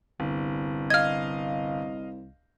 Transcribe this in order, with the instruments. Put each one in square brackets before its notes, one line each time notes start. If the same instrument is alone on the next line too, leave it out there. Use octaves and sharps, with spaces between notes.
[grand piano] G1 [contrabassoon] C2
[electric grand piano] D#5 F5 [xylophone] F6 G#6